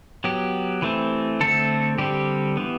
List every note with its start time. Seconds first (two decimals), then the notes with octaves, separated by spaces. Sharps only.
0.24 F#3 B3 G4
0.82 E3 A3 C4
1.40 D3 A3 C4 A4
1.98 D3 G3 C4 G4
2.57 E3 B3